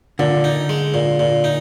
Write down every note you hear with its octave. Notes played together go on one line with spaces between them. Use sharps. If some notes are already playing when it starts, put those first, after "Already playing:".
A#2 D3
D#4
G#3
A#2
A#2
D#4